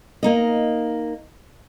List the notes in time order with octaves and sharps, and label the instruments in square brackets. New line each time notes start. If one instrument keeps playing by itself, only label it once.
[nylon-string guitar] A#3 D#4 D#5